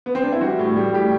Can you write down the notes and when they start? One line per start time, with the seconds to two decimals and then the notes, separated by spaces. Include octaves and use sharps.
0.06 B3
0.15 C4
0.23 D4
0.32 E4
0.41 G3 F#4
0.59 A2
0.76 G3
0.94 A2 G4